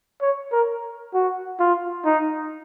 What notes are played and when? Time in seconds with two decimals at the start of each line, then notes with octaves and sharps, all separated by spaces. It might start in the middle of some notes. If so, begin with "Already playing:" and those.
0.21 C#5
0.52 A#4
1.14 F#4
1.59 F4
2.05 D#4